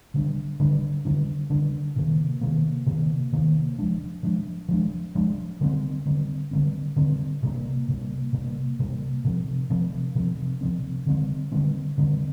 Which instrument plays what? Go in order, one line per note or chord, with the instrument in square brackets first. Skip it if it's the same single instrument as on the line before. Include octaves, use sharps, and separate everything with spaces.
[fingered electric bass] D3 G3 D4
D3 G3 D4
D3 G3 D4
D3 G3 D4
C3 D#3 A#3
C3 D#3 A#3
C3 D#3 A#3
C3 D#3 A#3
F3 G#3 D4
F3 G#3 D4
F3 G#3 D4
F3 G#3 D4
D3 G3 C4
D3 G3 C4
D3 G3 C4
D3 G3 C4
C3 G3 A#3
C3 G3 A#3
C3 G3 A#3
C3 G3 A#3
C3 F3 C4
C3 F3 C4
C3 F3 C4
C3 F3 C4
D3 G3 C4
D3 G3 C4
D3 G3 C4